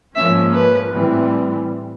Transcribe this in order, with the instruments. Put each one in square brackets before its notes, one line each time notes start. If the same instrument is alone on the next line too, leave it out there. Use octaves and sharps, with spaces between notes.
[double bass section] G#2 F3 A#3 C#4 [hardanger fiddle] E5
[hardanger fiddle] B4
[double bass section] A2 E3 G3 C4